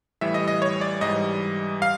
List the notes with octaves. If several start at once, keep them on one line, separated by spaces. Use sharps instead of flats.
A2 E3 G3 E5
D#5
D#5
C#5
D5
G#2 E3 G3 D#5
F5